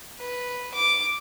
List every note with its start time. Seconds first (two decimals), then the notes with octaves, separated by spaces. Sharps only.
0.20 B4
0.74 D6